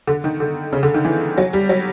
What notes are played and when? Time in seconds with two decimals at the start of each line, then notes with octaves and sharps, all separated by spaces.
0.07 D3
0.24 D#3
0.40 D3
0.73 C#3
0.83 D3
0.94 D#3
1.05 E3
1.38 F#3
1.53 G3
1.69 F#3